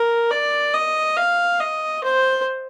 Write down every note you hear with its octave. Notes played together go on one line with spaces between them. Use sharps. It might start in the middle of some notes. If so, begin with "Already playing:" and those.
Already playing: A#4
D5
D#5
F5
D#5
C5